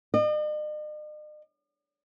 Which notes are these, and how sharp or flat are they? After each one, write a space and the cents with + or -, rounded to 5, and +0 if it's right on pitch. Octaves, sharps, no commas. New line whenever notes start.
D#5 -45